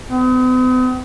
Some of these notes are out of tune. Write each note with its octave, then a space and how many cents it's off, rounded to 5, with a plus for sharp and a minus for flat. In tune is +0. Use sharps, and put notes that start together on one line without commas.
B3 +45